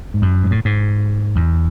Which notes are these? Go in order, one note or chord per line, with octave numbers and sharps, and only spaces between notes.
G#2
F#2
G#2
A2
G#2
E2